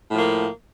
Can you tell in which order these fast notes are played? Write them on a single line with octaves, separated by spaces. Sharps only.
A2 F3 A#3